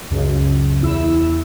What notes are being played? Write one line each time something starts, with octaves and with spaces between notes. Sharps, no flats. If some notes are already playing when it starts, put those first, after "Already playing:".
C#2 F#2 C#3
E2 E4 E6